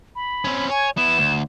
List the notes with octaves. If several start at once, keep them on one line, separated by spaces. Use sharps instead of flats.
B5
C4 C#4
C#5 G#5
B3 E4 E7
D2